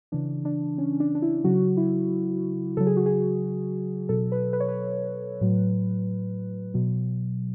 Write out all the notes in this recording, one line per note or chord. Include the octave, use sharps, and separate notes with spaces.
C#3 E3 D4
D4
C#4
D4
D4
E4
C#3 F#3 F#4
E4
C#3 F#3 A4
G#4
F#4
G#4
B2 F#3 A4
B4
B4
C#5
B4
A2 F#3
B2 F#3